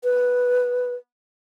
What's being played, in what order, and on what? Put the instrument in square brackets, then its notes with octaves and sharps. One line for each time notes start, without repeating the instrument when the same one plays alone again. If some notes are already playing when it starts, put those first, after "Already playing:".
[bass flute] B4